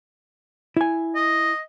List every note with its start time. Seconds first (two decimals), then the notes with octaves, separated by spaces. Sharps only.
0.77 E4 G#5
1.15 D#5